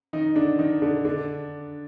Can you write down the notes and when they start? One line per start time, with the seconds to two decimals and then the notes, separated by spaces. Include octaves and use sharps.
0.13 D#3 D#4
0.36 D3 D4
0.59 D#3 D#4
0.82 D3 D4
1.05 D3 D4